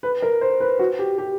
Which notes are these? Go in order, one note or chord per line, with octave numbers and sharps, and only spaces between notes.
B4
A#4
C5
B4
F#4
G4
G4